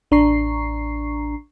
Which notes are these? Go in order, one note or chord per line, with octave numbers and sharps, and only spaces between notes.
A1 D4 A#5 C#6 C7